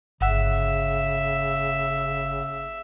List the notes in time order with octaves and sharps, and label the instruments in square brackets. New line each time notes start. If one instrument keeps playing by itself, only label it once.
[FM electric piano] G1 F#5 [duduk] C#3 [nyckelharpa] E5